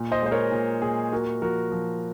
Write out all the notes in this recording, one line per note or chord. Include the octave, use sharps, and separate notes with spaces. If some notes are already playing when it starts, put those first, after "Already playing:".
Already playing: A#2
C5 D#5
G#3 C5
A#4 C#5
A#2
A#2 G#4
A#3 F#4 A#4
F3 F#4 A#4
F3